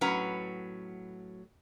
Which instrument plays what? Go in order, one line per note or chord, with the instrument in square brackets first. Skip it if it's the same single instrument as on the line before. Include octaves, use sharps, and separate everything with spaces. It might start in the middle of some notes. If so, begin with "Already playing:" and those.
[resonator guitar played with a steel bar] A2 F#3 C#4 B4 F#5 A#5